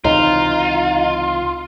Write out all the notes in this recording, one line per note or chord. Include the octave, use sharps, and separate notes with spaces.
C#2 C3 E3 D#4 F4